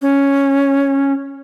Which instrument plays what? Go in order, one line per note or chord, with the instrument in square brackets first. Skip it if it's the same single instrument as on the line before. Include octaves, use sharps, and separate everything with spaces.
[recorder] C#4